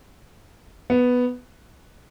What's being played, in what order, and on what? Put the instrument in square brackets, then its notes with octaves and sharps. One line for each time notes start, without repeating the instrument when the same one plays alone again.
[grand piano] B3